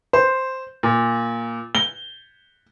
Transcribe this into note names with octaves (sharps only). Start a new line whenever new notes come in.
C5
A#2
G7